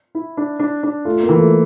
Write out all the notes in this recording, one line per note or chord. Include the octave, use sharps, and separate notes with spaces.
E4
D4
D4
D4
A3 F4
A#3
E3
A3